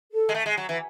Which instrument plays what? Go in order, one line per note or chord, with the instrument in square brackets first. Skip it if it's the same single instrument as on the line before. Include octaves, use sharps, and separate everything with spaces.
[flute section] A4
[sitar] G#3
A3
G#3
F#3
E3